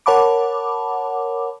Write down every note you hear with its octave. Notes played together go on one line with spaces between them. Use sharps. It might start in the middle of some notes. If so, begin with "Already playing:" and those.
A#4 C#5 F#5 A5 B5 D6